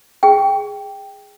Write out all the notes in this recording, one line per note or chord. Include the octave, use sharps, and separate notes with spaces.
G#4 G5